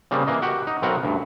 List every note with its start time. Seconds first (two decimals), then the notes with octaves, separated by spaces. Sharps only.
0.11 C#3 G3 A#3 C4
0.27 E3 A#3 D#5
0.42 F#4 G4 F#5
0.67 D#4
0.82 B1 C4 F#4 A#4 B4 F#5
1.03 D2 G2